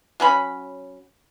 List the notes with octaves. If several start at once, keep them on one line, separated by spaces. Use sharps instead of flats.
F#3 C#4 B5